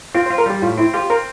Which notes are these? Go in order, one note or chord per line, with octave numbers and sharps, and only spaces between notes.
C4 F4
C5
F4
A#4
G3 G4
A2 F4
C4 E4
F4 G4
C4 A#4